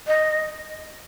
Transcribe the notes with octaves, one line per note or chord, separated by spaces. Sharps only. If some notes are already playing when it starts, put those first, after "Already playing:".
D#5